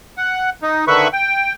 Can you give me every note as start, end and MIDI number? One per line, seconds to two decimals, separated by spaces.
0.17 0.50 78
0.62 0.85 63
0.88 1.08 50
0.88 1.08 51
0.88 1.08 71
0.88 1.08 76
0.88 1.08 83
0.88 1.08 85
1.13 1.53 79